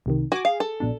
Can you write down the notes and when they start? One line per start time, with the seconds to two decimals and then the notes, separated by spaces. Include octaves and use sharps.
0.06 C2 C3 D#3
0.32 F#4 G#5 D6
0.45 G#4 F5
0.60 A4
0.80 A#1 B2 D4